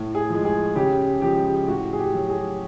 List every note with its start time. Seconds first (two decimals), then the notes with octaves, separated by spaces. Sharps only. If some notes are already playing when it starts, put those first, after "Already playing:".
Already playing: A2
0.15 G#4
0.30 F3 G#3
0.45 G#4
0.75 C#3 G4
1.22 F3 G#3 G4
1.68 A2 F#4
1.93 G#4
1.99 G4
2.15 F#3
2.30 G#4